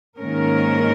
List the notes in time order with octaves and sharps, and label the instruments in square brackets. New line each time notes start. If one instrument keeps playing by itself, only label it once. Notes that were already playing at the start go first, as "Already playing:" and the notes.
[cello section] G#2 D#3 A#3 C#4 A#4